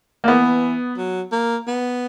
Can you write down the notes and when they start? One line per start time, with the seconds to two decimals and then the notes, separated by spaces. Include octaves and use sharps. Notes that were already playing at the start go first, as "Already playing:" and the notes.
0.24 A#3
0.28 E3 B3
0.97 F#3
1.32 A#3
1.67 B3